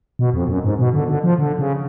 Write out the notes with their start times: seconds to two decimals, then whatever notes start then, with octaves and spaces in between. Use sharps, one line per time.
0.19 B2
0.34 F2
0.49 F#2
0.64 G#2
0.79 B2
0.94 D3
1.09 D3
1.24 F3
1.39 D3
1.59 C#3